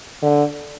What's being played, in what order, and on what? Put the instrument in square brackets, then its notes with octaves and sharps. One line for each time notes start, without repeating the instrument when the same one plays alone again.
[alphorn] D3